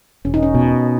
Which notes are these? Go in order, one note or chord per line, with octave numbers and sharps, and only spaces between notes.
E1 C#4
D#4
C#4
B2